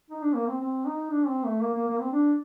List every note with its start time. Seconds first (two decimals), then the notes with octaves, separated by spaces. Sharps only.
0.10 D#4
0.22 D4
0.35 A#3
0.47 C4
0.61 C4
0.86 D#4
1.11 D4
1.28 C4
1.45 A3
1.62 A#3
1.74 A#3
1.88 A#3
2.00 C4
2.13 D4